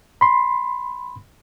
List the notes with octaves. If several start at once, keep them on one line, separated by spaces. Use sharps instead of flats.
B5 C6